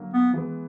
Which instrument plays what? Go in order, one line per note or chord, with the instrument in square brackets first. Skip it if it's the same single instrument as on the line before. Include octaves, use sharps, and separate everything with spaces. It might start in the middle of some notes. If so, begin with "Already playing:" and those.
Already playing: [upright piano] D3 F#3 A#3
[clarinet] B3
[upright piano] E3 G#3 B3